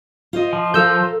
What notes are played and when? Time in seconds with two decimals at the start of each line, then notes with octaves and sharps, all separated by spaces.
0.33 F4 C5 D#5
0.53 F3
0.74 A4 A#4 F5 E6 G6